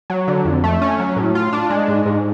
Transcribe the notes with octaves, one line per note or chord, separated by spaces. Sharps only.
F#3
D3
F2
A3
C#4
F#3
A2
F4
D4
G#3
G#2
G#2